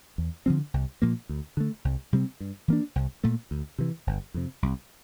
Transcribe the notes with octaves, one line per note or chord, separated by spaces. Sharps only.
E2
D3 F3 C4
C2
A#2 F3 A#3
D2
D3 A3
C2
C3 G3 C4
G2
E3 A#3 D4
C2
A#2 A3
D2
C3 E3
G1
F2 C3
C2